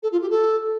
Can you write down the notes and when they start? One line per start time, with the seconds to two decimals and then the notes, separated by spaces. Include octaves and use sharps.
0.03 A4
0.12 F4
0.21 G4
0.30 A4